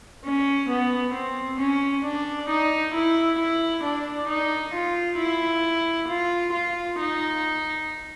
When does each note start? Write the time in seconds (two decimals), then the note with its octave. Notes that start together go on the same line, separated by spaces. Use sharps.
0.24 C#4
0.69 B3
1.14 C4
1.60 C#4
2.04 D4
2.49 D#4
2.94 E4
3.39 E4
3.84 D4
4.29 D#4
4.74 F4
5.19 E4
6.08 F4
6.53 F4
6.99 D#4